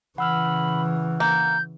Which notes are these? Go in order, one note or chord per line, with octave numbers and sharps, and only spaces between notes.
C#3 E3 F#5 B5 E6 F6
A#3 G6